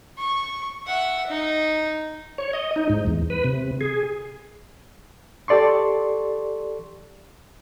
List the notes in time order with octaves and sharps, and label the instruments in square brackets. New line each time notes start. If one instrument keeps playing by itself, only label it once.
[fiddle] C#6
E5 F#5
D#4
[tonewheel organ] C#5
D#5
D#4
G#2
E2
B4
C3
G#4
[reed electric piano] G4 A4 D5 C6 C#6